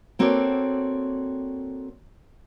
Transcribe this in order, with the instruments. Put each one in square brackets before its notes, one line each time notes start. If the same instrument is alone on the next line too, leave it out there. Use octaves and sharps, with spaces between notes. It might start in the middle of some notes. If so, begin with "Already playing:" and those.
[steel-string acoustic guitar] A#3 C4 F#4 A4 C#5 D5